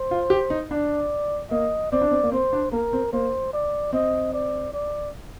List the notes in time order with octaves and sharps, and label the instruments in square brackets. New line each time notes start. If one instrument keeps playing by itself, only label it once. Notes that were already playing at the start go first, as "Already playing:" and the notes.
Already playing: [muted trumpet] C5
[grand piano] F4
G4
D#4
[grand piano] D4 [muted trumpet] D5
[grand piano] A#3 [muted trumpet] D#5
[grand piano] C4 [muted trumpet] D5
[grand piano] D4
C4
A#3
[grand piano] C4 [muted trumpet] C5
[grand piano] D4
[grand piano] A#3 [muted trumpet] A#4
[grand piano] C4
[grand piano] A#3 [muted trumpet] C5
[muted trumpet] D5
[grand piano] C4 [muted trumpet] D#5
[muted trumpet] D5
D5